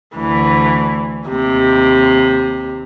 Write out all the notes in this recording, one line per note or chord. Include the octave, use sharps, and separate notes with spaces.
D2 E3
D#2 C3